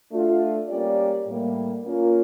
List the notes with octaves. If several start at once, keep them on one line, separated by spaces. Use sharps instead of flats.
A3 D4 F4
G3 A#3 C#4 G4 D5
A2 G3 A#3
A#3 C#4 F4